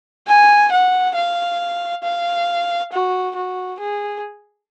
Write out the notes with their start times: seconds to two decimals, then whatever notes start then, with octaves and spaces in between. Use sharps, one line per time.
0.27 G#5
0.72 F#5
1.15 F5
2.03 F5
2.92 F#4
3.35 F#4
3.80 G#4